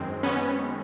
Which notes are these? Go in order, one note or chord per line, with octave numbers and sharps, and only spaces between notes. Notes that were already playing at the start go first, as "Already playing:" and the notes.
Already playing: F#2 D#3 G#3 C4
B3 C#4